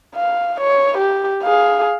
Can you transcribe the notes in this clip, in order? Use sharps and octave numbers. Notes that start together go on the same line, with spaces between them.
F5
C#5
G4
G#4 F5